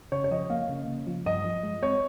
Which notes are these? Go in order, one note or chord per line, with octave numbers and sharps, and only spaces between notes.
C#3 C#5
C#5
F3 D#5
A#3 F5
C#3
C#3
F3
G2 D#5
F3
G#3
C4 C#5